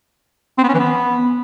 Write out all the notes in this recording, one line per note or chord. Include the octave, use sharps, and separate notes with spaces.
C4
B3
C#4
E3
B3